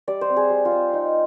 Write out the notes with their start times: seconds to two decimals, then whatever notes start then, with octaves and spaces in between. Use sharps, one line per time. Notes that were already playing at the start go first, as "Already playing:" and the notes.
0.07 G3 D5
0.21 C5
0.29 C4
0.37 G#4
0.50 G3
0.65 F4
0.71 C4
0.94 D#4